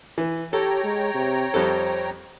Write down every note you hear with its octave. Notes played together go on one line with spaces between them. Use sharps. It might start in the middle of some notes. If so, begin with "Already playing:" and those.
E3
G4 A4 C#5 G5 A#5
G#3
C3
F2 G3 A4 C5